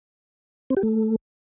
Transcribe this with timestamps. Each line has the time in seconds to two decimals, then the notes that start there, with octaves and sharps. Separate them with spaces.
0.70 C4
0.77 G4
0.83 A3